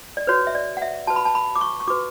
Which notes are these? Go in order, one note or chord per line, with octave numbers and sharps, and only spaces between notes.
D5
F#4 B4 C#5
E5
D5
F#5
E5
F#4 B4 A5
B5
A5
B5
D6
C#6
C#6
F#4 B4 D6